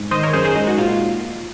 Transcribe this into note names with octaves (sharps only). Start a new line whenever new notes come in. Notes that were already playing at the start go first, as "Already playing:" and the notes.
Already playing: G#2
D#3 C5 D#5
A#4 C#5
F#2 G#4 C5
G#4 C5
G#3 D#4
D#4 F#4
A#2 F4
F4